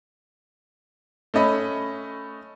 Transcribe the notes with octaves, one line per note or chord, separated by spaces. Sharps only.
A3 C#4 D#5 B5